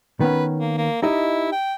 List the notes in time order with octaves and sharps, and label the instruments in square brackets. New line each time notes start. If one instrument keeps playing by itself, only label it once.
[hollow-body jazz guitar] D#3 B3 C#4 [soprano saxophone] B4
[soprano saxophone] A#3
A#3
[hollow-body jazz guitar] D#4 G4 D#5 [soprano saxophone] E4
[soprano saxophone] G5